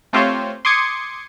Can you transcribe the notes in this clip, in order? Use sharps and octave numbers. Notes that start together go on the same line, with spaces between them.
A3 C4 F4 G4 C5 C#5
C6 D6 D#6 G#6 C#7